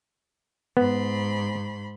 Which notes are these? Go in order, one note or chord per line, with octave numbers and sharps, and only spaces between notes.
G#2 B3 B5 C6